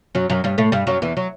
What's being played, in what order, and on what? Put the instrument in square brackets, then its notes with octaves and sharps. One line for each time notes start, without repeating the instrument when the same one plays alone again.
[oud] F#2 F#3
F#2 F#3
G2 G3
A2 A3
G2 G3
F#2 F#3
E2 E3
F#3